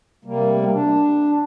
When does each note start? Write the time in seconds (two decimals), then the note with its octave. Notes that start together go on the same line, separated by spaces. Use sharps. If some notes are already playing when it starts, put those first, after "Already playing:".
0.25 C3 G3 A#3
0.53 A3
0.62 A#3
0.72 D4